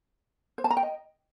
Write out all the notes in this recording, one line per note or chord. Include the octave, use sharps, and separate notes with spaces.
C5
A5
A#5
G5
D#5